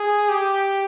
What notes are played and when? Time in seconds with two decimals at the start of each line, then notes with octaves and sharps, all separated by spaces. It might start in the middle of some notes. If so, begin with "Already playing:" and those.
Already playing: G#4
0.29 G4